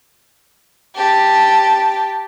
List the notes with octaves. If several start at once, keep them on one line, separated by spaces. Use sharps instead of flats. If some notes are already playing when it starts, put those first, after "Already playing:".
G4 A5